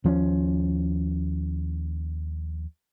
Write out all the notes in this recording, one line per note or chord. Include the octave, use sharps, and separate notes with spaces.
D#2 F3 F#3 C#4